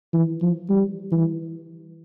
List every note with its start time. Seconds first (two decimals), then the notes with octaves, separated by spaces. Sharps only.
0.13 E3
0.42 F3
0.70 G3
1.12 E3